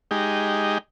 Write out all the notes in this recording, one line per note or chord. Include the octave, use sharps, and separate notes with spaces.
G#3 D#4 G4